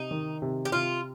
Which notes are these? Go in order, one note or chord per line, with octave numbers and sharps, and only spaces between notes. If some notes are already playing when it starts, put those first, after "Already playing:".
Already playing: C3 D#4
D#3
C3
G4
C3 F4